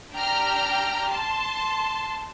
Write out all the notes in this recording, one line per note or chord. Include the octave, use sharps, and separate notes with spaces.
D4 G4 G5 A#5 F6
A5 C6